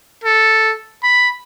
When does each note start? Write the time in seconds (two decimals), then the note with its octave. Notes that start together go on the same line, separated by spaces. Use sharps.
0.24 A4
1.03 B5